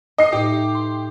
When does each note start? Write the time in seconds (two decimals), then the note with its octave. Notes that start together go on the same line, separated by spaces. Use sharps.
0.18 D#4 E4 D#5 C7
0.32 A2 G4 C#7
0.75 C6